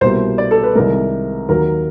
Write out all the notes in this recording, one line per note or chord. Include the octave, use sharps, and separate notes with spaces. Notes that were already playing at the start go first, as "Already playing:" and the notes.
C2 B2 G3 A#3 C5
D5
A4
B4
C2 C3 D#3 G#3 A#4
D#2 D#3 F#3 A#4